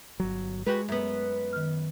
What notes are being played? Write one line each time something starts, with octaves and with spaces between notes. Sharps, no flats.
G1 F#3
G#3 F#4 G4 B4
F#2 B3
D#3 F6